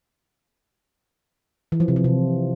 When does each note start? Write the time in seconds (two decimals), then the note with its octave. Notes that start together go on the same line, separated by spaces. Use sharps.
1.72 E3
1.80 F3
1.88 C3
1.96 F3
2.04 C3